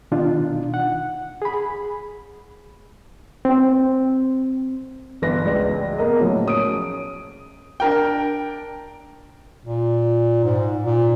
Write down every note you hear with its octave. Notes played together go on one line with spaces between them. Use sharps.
B2 D#3 D4 D#4 F4
F#5
G#4 B5
C4
G1 E3 B4 A#6
C#2 D5
A#3 B3 A#4 D#5
A2 C#3 F3 F#3
C#4 D#6 D7
D4 A#4 G5
A#2
G#2
A#2